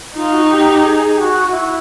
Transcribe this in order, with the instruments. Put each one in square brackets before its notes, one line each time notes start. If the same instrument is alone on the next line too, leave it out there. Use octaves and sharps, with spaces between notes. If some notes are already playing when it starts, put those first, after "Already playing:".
[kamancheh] D#4 [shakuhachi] F4
[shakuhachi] F#4
G4
G#4
G4
F#4
E4